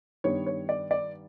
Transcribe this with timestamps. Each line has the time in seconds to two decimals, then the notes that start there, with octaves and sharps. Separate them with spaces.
0.24 G2 D#3 G3 B3 C#5
0.46 C#5
0.69 D5
0.91 D5